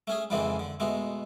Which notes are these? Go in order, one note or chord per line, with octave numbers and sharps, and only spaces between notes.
A3 C#4 G#4
F2 G#2 C#3 E3 A#3 C4
D3
B2 G#3 A3